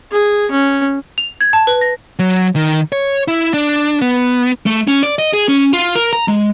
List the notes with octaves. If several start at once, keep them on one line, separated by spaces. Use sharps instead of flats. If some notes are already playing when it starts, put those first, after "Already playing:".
G#4
C#4
F7
G#6
A5
B4
A#6
F#3
D#3
C#5
E4
D4
B3
A3
C#4
D5
D#5
G#4
C#4
F4
A#4
A#5
G#3